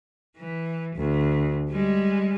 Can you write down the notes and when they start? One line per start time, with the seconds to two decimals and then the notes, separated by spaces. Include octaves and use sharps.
0.37 E3
0.96 D2
1.70 G3 G#3